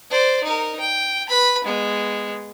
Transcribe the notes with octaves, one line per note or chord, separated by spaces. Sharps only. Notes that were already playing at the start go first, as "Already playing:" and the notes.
C5 D5
D#4 A#4
G5
B4 B5
G#3 B3